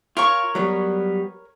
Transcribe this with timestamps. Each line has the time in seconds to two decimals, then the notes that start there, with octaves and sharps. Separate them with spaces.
0.17 F4 A#4 C#5 C#6
0.55 F#3 G3 B3